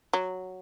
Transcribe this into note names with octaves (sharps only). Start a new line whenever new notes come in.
F#3